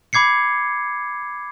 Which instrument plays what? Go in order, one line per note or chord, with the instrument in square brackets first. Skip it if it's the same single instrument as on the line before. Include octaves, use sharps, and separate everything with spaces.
[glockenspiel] B5 D6 G#6 C7 C#7